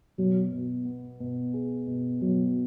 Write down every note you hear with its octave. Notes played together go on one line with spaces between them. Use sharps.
B2 F#3
B2
B3
B2
G#4
B2
B2 F#3